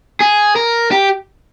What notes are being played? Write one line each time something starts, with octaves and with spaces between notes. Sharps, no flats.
G#4
A#4
G4